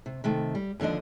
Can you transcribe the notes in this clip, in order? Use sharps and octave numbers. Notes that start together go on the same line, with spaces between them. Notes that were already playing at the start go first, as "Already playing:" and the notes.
C3
C3 D#3 A3
G3
D#2 D3 F3 D4 D#5